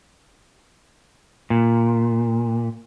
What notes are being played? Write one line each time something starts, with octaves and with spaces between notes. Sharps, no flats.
A#2